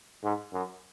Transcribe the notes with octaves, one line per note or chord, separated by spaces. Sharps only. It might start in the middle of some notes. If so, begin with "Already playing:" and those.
G#2
F#2